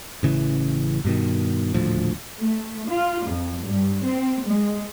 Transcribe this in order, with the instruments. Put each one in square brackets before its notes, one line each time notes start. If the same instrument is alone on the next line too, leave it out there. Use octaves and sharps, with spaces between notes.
[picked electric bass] A1 C#3 E3
G2 B2 D#3
D#1 D2 A2 F3
[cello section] A3
F4
F2
G2
C4
G#3